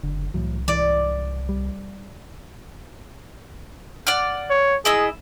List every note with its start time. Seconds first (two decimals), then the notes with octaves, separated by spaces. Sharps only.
0.03 F#1 D3
0.34 C2 A2 E3 F#3
0.68 G#2 E3 D5
1.49 G3
4.07 D5 F#5 F6
4.50 C#5
4.85 E4 G#4 D#5 E6